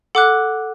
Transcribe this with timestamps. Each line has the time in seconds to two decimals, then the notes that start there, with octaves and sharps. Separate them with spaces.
0.15 A4 F#5 D6 F#6